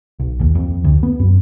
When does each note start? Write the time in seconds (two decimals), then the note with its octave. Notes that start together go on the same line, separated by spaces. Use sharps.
0.20 B1
0.41 D#2
0.55 F2
0.84 D2
1.03 B3
1.20 F#2